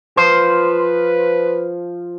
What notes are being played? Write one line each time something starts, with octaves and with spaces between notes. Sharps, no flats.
F3 B4 C5